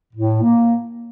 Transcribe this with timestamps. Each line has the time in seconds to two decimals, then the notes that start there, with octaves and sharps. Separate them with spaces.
0.14 A2
0.42 A#3